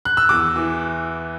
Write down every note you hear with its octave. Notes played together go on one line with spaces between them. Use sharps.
F#6
E6
E2 D6
E3